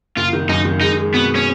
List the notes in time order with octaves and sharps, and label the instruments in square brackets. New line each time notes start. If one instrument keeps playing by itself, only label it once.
[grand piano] F#1 [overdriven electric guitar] F4
[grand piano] D#3
[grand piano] F#2 [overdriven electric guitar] D#4
[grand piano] D#3
[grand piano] G#3 [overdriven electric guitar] D#4
[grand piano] G#3
[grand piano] B2 [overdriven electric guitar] B3
[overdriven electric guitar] C#4